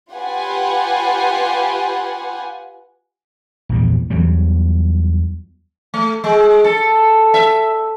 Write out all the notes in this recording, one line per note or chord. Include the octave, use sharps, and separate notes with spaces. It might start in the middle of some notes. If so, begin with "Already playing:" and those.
F4 G4 B4 F#5 G#5
A#1 E2 G2
E2 E3 F#3 G3
A3
G#3
A4
E5